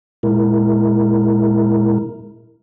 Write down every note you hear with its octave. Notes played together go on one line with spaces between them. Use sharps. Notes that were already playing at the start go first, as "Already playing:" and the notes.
A#2 G#3 E4 A#4